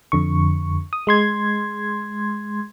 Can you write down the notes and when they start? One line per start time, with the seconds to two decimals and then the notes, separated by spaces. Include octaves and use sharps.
0.12 F2 D3 C#6
0.93 D#6
1.07 G#3 C6 G#6